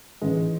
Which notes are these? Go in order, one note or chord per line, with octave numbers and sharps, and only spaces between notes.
A1 G#2 E3 G#3